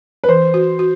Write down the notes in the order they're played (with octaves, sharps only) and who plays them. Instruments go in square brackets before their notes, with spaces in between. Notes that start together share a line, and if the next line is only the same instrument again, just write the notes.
[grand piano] B4
[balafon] E3 [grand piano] C5
[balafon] F#4
F#4